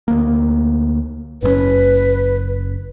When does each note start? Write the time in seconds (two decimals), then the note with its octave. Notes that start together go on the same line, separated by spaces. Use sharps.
0.08 D2 A#3
1.43 F#1 A2 C#4 B4